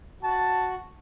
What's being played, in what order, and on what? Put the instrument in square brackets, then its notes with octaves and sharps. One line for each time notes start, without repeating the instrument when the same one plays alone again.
[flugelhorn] F#4 [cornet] A5